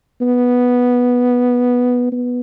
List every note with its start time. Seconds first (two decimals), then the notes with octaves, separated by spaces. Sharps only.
0.21 B3
2.12 B3